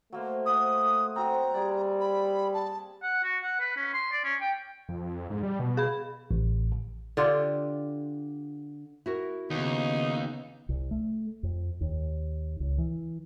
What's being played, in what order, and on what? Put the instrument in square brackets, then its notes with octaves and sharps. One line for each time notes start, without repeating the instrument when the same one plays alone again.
[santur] F#3 A#3 C5 [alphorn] A3
[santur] C5 F#5 [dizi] D#6
[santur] F#3 C4 [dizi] A#5
[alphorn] G3 [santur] G#4 D5
[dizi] B5
A5
[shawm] F#5
F#4
F#5
B4
C#4
C6
D5
C#4
G5
[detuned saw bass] F2
G#2
G3
B2
[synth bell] G#4 B5
[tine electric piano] A1
[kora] D3 F4 G4
[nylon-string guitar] E4 F#4 A#4
[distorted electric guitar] D#2 [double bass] C#3 B3 [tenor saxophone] D#4
[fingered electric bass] C2
A3
F2
D#2
C#2
E3